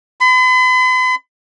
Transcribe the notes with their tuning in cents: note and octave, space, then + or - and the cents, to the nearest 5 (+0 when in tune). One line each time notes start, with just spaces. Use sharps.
B5 +45